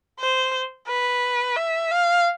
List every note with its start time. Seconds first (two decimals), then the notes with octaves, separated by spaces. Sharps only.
0.19 C5
0.87 B4
1.56 E5
1.91 F5